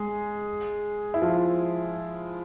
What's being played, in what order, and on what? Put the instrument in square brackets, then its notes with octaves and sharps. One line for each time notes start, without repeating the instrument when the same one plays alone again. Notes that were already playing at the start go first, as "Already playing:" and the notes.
Already playing: [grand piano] G#3 G#4
E4
F3 F4